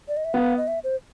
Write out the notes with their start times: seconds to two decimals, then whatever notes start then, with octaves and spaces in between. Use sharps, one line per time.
0.08 D5
0.17 D#5
0.25 E5
0.34 B3 F5
0.57 D#5
0.68 E5
0.84 C5